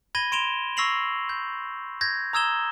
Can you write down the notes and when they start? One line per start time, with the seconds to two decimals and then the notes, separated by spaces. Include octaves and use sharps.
0.15 B5 G#6 A#6 D#7 G7
0.32 C6 D7 E7 F7 G7
0.77 C#6 E6 A#6 C7 F7 F#7
1.29 G6
2.01 G6 G#6 A#6
2.33 A#5 D#6 E6 G#6 E7 G7